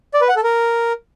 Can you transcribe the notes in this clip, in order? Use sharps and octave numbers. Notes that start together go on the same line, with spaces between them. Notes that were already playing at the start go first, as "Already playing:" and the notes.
D5
B4
F#5
A4
A#4